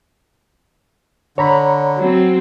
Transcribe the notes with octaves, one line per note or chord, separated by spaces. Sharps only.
D3 C#5 A#5 B5
F#3 C4